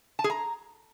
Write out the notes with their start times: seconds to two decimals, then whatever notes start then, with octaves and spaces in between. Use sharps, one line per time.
0.19 A5
0.24 G#4
0.30 A#5